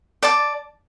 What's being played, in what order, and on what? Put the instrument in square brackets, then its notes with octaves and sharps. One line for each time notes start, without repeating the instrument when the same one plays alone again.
[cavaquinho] D5 A5 D6